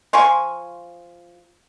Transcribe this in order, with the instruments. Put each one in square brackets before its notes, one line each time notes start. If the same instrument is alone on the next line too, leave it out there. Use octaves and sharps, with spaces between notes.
[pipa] F3 F4 G#5 C#6